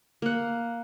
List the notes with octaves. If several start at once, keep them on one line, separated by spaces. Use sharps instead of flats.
A#3 F#5